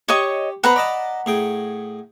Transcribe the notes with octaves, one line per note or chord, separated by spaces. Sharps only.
G4 C#5 D#5 C#6
B3 B4 C5 F#5 A#5 B5
D5 D#5 A5
A2 G#4 G5